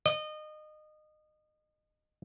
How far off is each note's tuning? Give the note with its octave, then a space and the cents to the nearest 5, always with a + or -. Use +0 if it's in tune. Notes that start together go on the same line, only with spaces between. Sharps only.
D#5 -25